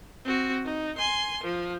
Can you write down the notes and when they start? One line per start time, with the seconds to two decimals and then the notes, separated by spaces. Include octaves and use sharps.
0.25 C4 F#4
0.65 D#4
0.98 G#5 C6
1.44 F3